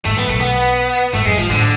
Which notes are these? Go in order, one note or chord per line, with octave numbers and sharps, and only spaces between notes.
G#1 G#2 A3
A1 A2 B3
B1 B2 A3
B3
G#1 G#2 A3
F#2 G#3
G#1 G#2 F3
A1 A2 D3